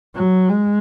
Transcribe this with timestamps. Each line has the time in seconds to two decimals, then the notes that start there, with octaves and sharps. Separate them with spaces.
0.16 F#3
0.49 G#3